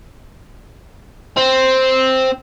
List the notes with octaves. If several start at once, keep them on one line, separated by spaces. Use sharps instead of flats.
C4